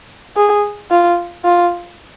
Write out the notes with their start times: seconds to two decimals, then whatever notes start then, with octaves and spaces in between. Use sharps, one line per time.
0.36 G#4
0.91 F4
1.45 F4